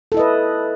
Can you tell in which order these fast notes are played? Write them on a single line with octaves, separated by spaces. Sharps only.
A4 E4 D#5 B4